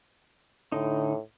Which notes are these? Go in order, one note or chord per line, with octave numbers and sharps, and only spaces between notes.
A2 D3 D#4